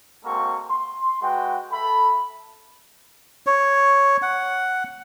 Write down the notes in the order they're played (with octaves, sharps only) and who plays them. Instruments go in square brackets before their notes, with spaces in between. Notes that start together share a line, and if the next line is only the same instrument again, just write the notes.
[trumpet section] G#3 A#3 C4 F#4 A4 C#6
C6
G#3 F#4 B4 F#5 G5
A4 E5 B5
[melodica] C#5
F#5